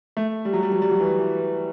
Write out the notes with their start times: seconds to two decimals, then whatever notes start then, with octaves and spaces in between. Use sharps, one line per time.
0.17 A3
0.45 G3
0.53 F#3
0.63 G3
0.72 F#3
0.82 G3
0.91 F#3
1.00 E3
1.20 E3